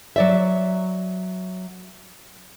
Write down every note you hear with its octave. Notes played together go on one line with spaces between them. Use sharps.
F#3 D5 E5